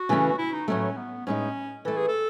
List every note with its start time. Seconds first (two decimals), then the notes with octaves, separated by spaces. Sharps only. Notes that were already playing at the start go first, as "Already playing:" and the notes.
Already playing: F#4
0.09 C#3 E3 A3 C#4
0.38 E4
0.53 D#4
0.68 A2 F#3 A3 C#4
0.97 B3
1.27 A2 G#3 C#4 D#4
1.85 E3 A3 E4 A4
1.97 G#4
2.08 A4